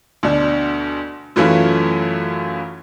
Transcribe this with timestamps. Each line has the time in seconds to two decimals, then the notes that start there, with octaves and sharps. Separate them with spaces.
0.23 D2 B2 D4
1.36 F#2 E3 F#3 A3 E4 F4